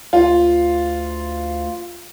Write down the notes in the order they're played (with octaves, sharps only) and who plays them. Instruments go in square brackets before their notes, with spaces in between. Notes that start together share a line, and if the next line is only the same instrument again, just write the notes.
[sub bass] D2 [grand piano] F4